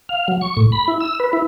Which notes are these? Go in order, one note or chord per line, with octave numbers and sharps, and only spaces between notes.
F5
F#3
C#6
A2
B5
E4
E6
B4
E4